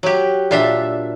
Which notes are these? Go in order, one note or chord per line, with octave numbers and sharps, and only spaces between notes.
F#3 G4
A#2 D4 E5